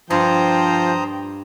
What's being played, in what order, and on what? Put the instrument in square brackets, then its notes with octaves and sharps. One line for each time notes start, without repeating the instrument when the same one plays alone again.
[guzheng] G2 [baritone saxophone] F3 [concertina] C5 A#5 D#6 [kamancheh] G5